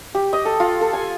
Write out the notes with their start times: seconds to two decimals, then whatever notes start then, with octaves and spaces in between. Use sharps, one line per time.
0.15 G4
0.33 D#5
0.45 A4
0.60 F4
0.81 A4
0.93 G#5